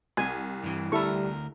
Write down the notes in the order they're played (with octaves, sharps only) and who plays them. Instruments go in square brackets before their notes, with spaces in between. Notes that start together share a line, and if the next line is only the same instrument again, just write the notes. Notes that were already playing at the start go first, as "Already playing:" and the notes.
[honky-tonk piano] C2 [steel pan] G#5
[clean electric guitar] G2 E3
[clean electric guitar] D2 A#4 [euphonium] G3 [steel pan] E4 A4 C#6